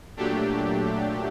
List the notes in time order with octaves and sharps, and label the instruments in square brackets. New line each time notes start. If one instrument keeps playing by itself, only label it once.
[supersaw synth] A#2 F#3 A3 D4 G4